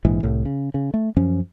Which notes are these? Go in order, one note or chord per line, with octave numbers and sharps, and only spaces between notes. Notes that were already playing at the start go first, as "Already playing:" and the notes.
A#1 G#2 E3
C2 A2
C#3
C#3
A3
F#2 F3 C#4